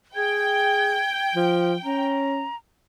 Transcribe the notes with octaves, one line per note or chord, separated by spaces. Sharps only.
G#4 G5 G#6
F3
C#4 A#5